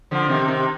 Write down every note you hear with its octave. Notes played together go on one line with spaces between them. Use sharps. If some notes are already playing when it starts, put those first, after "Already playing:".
D3 F3
C3 D#3
C3 D#3